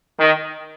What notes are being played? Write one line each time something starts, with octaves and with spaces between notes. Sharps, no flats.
D#3